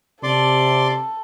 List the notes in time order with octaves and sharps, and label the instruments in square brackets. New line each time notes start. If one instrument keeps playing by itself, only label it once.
[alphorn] C3 [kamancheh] A4 [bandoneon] D5 C6 D6